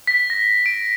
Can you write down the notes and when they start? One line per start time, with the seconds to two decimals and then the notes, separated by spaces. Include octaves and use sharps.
0.07 B6
0.30 A#6
0.66 D7